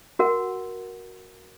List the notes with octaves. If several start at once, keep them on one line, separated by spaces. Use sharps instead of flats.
F#4 A#4 F#5